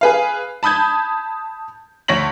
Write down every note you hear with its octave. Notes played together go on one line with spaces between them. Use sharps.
G#4 B4 F5
A5 B5 D#6 G6 G#6
D2 C#5 A#6 B6 F#7